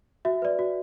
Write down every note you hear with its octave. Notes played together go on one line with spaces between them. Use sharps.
F#4 E5
B4 D5
F#4